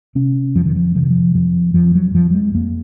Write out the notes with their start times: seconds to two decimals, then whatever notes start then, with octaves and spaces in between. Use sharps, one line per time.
0.15 C3 C#4
0.55 F2 F3
0.65 D#3
0.76 F3
0.95 C3 F3
1.03 D#3
1.10 F3
1.35 F2 F3
1.74 F2 F3
1.95 F#3
2.14 F2 F3
2.30 F#3
2.35 G#3
2.54 F2 A#3